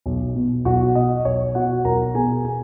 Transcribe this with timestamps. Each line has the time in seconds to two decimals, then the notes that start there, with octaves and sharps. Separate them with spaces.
0.06 B1
0.35 B2
0.65 B1 F#4 F#5
0.95 B2 D#5
1.25 B1 C#5
1.55 B2 F#4 F#5
1.85 B1 A#4 A#5
2.14 B2 G#4 G#5
2.45 G#4 G#5